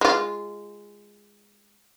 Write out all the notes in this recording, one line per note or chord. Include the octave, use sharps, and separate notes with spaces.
G#3 F4